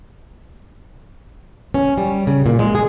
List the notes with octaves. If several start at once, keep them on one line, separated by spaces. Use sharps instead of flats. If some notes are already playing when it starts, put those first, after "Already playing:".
C#4
G3
C#3
A#2
G#3
G#4